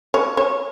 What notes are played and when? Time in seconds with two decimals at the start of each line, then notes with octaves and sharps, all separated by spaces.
0.14 C#5
0.37 C#5